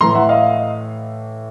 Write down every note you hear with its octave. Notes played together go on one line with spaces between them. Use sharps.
A2 E3 A3 A#5 C6
E5 F#5
D#5 F5